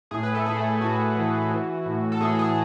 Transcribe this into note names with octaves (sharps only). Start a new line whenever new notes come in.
A2 G#4
B4
A3 A4
A2 G#4
A3 A4
A2 F#4
E3
E3
A2
A4
A2 G#4
G#4